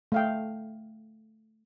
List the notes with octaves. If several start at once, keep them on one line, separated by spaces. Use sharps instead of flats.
A3 F5 G5